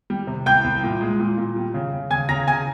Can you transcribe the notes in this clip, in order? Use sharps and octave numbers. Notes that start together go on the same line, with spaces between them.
G3
C3
C2 G5 G6
C2
A#2
G#3
A#2
A#2
G3
C#3
C#3
C#3 G#5 G#6
C#3 A#5 A#6
C#3 G#5 G#6